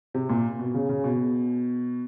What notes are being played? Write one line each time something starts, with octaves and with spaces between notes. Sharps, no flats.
C3
A#2
B2
C#3
C#3
B2